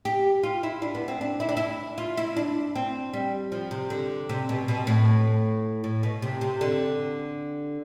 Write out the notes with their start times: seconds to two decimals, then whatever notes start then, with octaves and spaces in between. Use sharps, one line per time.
0.05 G4
0.43 F4
0.63 E4
0.82 D4
0.95 B3
1.08 C4
1.21 D4
1.40 E4
1.49 D4
1.57 E4
1.98 F4
2.17 E4
2.37 D4
2.75 C4
3.14 G3
3.52 F3
3.71 C3
3.90 D3
4.29 C3
4.49 B2
4.68 B2
4.87 A2
5.84 A2
6.03 B2
6.22 C3
6.41 C3
6.61 D3